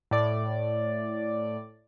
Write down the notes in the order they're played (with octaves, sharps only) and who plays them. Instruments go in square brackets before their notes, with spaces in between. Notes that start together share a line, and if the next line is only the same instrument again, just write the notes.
[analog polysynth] A2 D5